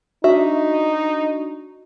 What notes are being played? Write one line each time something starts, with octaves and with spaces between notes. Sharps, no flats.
D4 D#4 F#4 D#5 E5